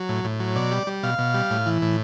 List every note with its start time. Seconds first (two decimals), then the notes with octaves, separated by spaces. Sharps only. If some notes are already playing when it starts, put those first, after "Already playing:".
Already playing: F#3
0.09 A2
0.24 A2
0.40 F#3
0.56 B2 D5
0.71 G3
0.87 G3
1.03 B2 F5
1.19 B2
1.34 G3
1.51 A2
1.66 E3
1.82 A2